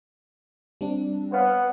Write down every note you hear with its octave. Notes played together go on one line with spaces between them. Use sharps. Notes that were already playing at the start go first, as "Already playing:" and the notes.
G3 C4 D4
B3 C5 C#5 F5